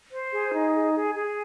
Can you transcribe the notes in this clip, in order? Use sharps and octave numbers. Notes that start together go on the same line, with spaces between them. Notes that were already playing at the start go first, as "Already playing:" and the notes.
C5
G#4
D#4
G#4
G#4
G#4